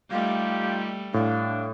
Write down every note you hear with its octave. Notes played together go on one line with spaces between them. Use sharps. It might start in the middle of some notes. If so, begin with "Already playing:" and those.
G3 A3 D#4 F4 G4 F5
A2 D4 F5